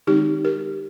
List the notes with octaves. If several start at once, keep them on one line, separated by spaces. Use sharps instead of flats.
D#3 G#3 C4 D#4 G4
G4 A#4